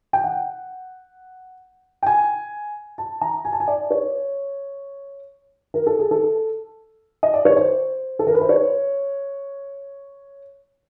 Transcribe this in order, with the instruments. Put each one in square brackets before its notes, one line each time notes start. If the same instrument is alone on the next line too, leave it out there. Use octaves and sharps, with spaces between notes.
[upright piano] G5
F#5
G5
G#5
A5
A#5
G#5
A5
G#5
D5
C#5
A#4
A4
G#4
A4
D#5
D5
C#5
C5
A4
A#4
B4
C5
C#5